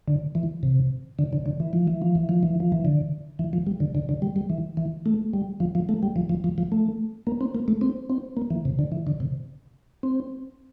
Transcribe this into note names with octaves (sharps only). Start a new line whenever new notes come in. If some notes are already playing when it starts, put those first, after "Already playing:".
D3
E3
C3
D3
D3
D3
E3
F3
E3
F3
E3
F3
E3
F3
E3
D3
E3
F3
G3
D3
D3
D3
G3
G3
E3
E3
A3
G3
F3
F3
A3
G3
F3
F3
F3
F3
A3
A#3
C4
A#3
A3
C4
C4
A#3
E3
C3
D3
E3
D3
C3
C4